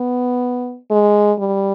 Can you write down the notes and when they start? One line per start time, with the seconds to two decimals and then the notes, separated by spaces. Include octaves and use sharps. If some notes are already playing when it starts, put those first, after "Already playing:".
Already playing: B3
0.91 G#3
1.38 G3